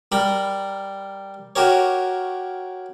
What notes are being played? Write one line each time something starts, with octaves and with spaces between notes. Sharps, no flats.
G3 A#4 B5
F#4 G4 A#4 C#5